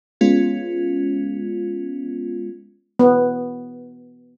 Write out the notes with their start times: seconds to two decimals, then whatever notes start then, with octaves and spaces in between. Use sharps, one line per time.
0.21 G#3 B3 C#4 F4
2.99 B3